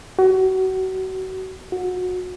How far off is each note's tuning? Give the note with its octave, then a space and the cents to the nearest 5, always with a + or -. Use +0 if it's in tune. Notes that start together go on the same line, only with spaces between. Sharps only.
F#4 +30
F#4 -25